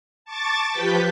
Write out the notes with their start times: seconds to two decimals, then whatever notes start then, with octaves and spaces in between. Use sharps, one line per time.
0.25 A5 C#6 D6 A6
0.70 F3 G4 B4 G6 B6